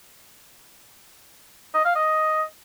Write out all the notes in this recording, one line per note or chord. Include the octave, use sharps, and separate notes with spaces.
D#5
F5
D#5